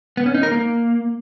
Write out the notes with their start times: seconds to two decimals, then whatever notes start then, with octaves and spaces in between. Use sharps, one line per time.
0.17 B3
0.26 C#4
0.34 D#4
0.43 A#4
0.52 A#3